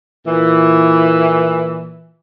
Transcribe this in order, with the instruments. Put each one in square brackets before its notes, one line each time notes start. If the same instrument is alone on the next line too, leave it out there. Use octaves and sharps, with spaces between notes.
[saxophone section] A#2 E3